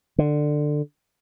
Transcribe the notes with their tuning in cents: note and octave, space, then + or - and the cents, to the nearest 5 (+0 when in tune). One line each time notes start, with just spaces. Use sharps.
D3 +15